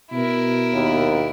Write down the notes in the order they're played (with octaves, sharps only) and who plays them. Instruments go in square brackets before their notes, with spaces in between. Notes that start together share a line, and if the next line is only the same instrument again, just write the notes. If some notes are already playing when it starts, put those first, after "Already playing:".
[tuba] B2 [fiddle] E4 A#4
[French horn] D#2